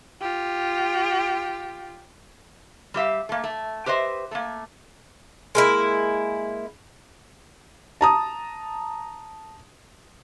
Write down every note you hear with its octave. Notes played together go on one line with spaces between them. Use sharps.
F4 G4
G3 G4 E5 F5
A3 A#3
A3
G4 B4 C5 D#5 E5
A3 A#3
G#3 A#3 E4
A5 A#5 D#6